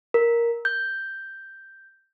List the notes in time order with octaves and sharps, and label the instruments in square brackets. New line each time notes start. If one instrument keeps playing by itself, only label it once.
[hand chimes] A#4
G6